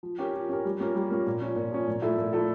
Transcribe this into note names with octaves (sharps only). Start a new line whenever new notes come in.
F3
C#4 G4 A#4
F3
C#4 G4 A#4
G3
A#3 C#4 F4 A#4
G3
A#3 C#4 F4 A#4
A#2
F3 C#4
A#2
F3 C#4
A#2
F3 A3 E4 A4
A#2
F3 A3 E4 A4